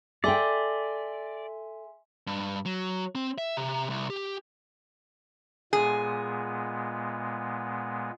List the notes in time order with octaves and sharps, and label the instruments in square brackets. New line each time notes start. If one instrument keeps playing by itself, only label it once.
[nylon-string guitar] A4 G5 [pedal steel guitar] D5 [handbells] E5 G#5 C6
[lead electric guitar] G2
F#3
C4
E5
C3
C2
G4
[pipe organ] A#2 G#3 B3 [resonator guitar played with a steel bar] G#4